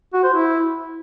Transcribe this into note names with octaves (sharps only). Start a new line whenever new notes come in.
F#4
C5
E4